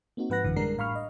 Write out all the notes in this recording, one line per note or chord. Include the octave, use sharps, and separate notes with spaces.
A#3 C4 D#4 F#4
G#2 F3 B4 F#5 F#6 A#6
A1 F#2 A2 D3 E3
G3 G#3 D4 A#4 C7
A2 F5 B5 C#6 F6
D#5